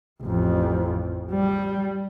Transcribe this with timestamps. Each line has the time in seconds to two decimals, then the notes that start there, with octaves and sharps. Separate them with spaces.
0.22 A1 F2
1.32 G3